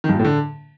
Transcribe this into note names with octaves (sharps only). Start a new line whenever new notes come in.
D#3
G2
A#2
A2
D3